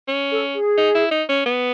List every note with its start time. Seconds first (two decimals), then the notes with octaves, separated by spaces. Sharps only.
0.08 C#4
0.31 A4
0.54 G#4
0.77 D#4
0.95 E4
1.11 D#4
1.29 C#4
1.46 B3